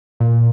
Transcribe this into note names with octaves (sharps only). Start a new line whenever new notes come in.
A#2